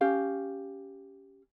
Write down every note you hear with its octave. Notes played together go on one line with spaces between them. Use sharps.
C#4 G4 F5